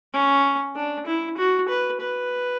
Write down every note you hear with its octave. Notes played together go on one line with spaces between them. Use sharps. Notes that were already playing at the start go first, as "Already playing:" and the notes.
C#4
D4
E4
F#4
B4
B4